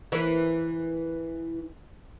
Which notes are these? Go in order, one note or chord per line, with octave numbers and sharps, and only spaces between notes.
E3 A#3 E4